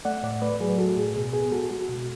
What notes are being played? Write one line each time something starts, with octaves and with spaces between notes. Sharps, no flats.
A3 D5 F#5
A2 D5 F#5
A3 B4 D5
F#3 G#4 B4
A3 F#4 A4
A2 G#4
B2 G#4
B3 G#4
G#3 F#4 A4
G#3 F#4
B2